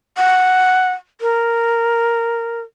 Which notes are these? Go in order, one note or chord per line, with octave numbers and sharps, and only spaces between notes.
F#5
A#4